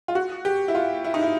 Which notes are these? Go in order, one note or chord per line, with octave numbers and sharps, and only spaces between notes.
F4
F#4
G4
E4
F4
E4
D#4
E4